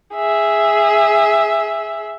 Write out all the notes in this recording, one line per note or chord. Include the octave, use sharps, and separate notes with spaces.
G#4 E5